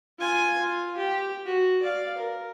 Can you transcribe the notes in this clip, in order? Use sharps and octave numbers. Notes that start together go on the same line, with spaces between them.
F4 G#5
F4
G4
F#4
D5 F5
A#4